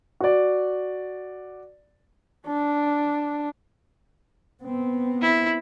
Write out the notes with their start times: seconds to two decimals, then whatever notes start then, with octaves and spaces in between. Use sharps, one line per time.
0.20 F#4 D5
2.46 D4
4.63 B3 C4
5.22 E4